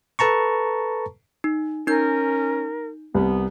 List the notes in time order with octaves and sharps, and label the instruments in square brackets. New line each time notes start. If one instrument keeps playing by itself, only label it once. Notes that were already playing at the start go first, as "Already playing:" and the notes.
[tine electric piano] A4 B4 A5 A#5 C#6
[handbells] D#4
[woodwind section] C#4 [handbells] D#4 G6 [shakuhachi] A#4
[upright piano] C2 [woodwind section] B3